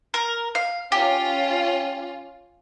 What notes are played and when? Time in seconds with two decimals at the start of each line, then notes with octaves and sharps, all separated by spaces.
0.14 A#4
0.55 F5
0.92 C#4 F4 G4